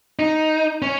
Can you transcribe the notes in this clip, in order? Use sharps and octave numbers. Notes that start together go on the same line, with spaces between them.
D#4
C#4